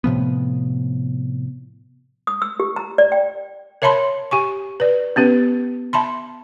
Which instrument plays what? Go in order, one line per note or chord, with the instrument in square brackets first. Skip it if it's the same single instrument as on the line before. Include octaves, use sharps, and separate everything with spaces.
[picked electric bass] A2 C3 F3 B3
[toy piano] D#6
E6
G4
A#5
D5
G5
[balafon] A#4 C#5 E5 A5 B5 C6
G4 G#5 C#6
B4 D5
B3 C#4 G4 B4
E5 A5 B5 C6